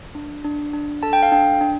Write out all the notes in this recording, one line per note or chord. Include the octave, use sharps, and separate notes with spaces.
D4
D4
D4
A4 A5
G5
F5
D4 G5
D4